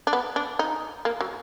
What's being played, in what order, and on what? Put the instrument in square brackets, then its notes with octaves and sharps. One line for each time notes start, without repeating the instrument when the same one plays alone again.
[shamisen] D4
B3
D4
D#4
A#3
F#3